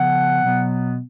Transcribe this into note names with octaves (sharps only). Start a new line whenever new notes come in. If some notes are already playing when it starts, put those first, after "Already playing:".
Already playing: C#3 F3 B3 F#5
B2 F#3 B3